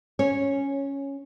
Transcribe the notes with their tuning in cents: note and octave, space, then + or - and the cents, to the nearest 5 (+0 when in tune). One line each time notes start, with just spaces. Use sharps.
C#4 +0 C#5 -10